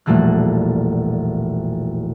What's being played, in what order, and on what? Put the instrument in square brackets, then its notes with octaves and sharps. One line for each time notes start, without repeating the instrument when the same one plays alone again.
[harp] E1 A#1 G3 A3 A#3 F#6